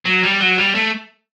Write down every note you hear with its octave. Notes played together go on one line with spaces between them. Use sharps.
F#3
G3
F#3
G3
A3